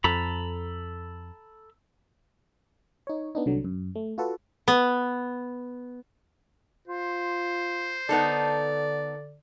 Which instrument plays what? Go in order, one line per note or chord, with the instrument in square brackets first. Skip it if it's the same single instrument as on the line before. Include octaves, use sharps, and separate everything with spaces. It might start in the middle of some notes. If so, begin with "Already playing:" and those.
[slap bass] F2 [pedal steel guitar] A4 A#5 B5
[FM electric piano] D#4 C#5
B3 D4 D#4
C2 D3 F#3
F#2
A3
F4 F#4 A4 B4
[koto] B3
[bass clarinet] F4 [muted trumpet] C5
[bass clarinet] D3 [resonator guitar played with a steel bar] B3 D#4 A4 [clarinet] D5